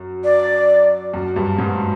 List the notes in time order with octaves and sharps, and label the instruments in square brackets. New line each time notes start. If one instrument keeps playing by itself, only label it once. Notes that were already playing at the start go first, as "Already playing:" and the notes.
Already playing: [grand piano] F#2
[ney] D5
[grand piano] F#2
G2
G#2